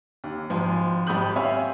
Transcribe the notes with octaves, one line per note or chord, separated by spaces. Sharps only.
D#2
G#1 F3 G#5 C6
G#1 G4 B5 D#6 G6 F#7
C4 C5 C#5 E5 F5 G#5